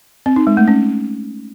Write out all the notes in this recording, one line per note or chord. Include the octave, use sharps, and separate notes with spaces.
C4
D#4
G#3
A3
C#4